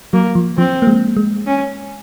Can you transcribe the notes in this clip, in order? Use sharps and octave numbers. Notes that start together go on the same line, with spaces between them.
F#3 A#3
F3
F3 C4
A#3
G#3
G#3
C#4